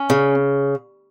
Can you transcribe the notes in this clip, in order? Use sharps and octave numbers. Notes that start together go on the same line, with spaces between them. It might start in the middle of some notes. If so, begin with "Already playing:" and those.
Already playing: C#4
C#3